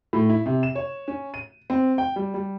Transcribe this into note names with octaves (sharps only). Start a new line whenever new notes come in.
A2
E4
C3
E7
C#5
C#4
D#7
C4
G5
G3
G3